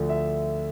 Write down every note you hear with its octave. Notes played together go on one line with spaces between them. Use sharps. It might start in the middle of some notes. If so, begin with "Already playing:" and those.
Already playing: D2 D3 F3
E5